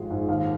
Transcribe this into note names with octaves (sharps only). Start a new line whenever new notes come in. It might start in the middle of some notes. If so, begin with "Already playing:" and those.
Already playing: G#1 F3 G#3
G#2
D#2 F5